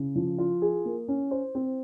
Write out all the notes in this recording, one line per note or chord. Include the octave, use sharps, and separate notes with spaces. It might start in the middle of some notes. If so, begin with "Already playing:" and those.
Already playing: C#3
F3
F4
G#4
A#3
C#4
C5
C4